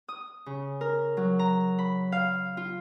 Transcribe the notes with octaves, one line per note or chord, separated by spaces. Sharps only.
D#6
C#3
A#4
F#3
A#5
B5
F5
F4